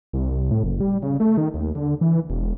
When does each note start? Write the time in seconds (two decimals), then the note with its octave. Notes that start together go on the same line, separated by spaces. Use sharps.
0.13 C2
0.31 C2
0.51 A2
0.64 F#1
0.80 G3
1.03 C#3
1.20 A3
1.37 D#3
1.54 D#2
1.75 D3
2.01 E3
2.30 E1